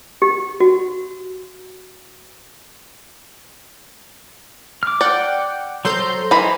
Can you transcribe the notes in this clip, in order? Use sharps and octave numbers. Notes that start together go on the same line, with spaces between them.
G4
F#4
D6 F6
D5 F#5 G5
F#3 A4 C5 A#5 C6 G6
E3 D#4 C5 A#5 B5